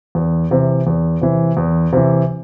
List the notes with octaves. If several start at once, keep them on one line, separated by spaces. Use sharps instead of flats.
E2
C3 E3
E2
C3 E3
E2
C3 E3